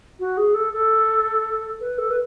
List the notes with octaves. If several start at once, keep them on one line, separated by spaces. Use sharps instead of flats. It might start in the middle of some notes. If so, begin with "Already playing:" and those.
F#4
G#4
A4
A4
B4
A4
B4